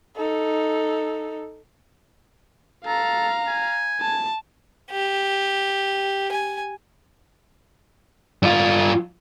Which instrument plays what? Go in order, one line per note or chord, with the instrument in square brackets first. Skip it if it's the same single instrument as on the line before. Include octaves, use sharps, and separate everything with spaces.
[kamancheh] D#4 A4
[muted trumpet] A4 [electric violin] F5 A#5
[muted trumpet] G#5
[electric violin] A5
[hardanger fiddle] G4
G#5
[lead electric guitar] G2 F4